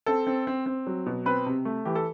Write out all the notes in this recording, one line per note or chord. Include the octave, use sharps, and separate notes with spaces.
C4 A4
C4
C4
C4
F#3
B2
C4 B4
C3
A3
E3 G4
A4